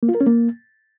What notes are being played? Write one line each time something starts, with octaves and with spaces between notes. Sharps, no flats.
A#3
F4
A#4
C#4
A#3